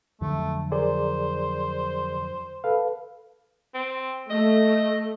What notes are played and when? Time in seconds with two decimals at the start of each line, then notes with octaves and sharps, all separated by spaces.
0.21 F2 D3 F#3 A3
0.72 G#4 A#4 C5 D5
2.64 A4 B4 F5
3.75 C4
4.31 A3 D#5